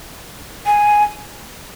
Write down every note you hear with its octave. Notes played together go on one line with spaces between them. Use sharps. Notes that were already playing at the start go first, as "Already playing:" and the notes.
G#5